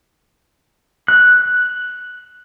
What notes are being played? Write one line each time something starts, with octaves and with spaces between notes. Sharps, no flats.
F#6